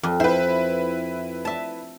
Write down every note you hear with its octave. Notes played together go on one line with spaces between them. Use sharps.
F2
E4 B4 C5
E5 A5